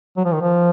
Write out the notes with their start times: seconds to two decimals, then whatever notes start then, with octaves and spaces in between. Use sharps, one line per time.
0.17 F#3
0.25 F3
0.33 D#3
0.41 F3